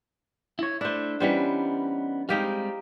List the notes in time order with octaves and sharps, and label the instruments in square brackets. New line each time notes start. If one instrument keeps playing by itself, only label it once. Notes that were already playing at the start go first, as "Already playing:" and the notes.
[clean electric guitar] E4 C#5
[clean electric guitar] A3 E4 [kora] D4 C5
[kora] E3 G3 C5 [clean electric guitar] B3 C#4 D#4
[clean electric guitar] G3 G#3 C4 [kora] D#4 G4 F5